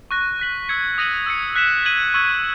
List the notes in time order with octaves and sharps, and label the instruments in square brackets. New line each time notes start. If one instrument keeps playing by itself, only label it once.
[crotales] C#6 F#6 A#6
F#6 B6 F#7
E6 G#6 C#7
D#6 A#6 D#7 F#7
E6 G#6 C#7
F#6 B6 E7
G#6 D#7 F#7
C#6 E6 G#6